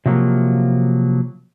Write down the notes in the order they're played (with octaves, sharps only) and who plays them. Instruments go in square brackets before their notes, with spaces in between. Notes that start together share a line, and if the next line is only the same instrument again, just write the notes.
[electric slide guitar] C3 F3 F#3 A#3